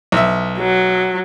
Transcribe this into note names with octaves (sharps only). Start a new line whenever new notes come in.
B1 E5
F#3